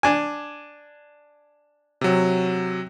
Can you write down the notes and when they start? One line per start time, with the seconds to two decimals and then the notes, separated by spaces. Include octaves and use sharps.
0.03 D4 G#5
2.01 C3 F#3